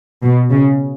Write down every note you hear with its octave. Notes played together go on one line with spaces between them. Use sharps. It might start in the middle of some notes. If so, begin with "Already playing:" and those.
B2
C#3